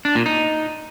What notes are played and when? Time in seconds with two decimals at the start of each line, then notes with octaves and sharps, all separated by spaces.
0.05 D4
0.15 A#2
0.26 D#4